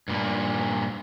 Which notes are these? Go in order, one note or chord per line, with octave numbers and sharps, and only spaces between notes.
G2 A#2